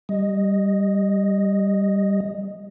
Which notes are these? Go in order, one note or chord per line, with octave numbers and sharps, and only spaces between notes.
G3 D#5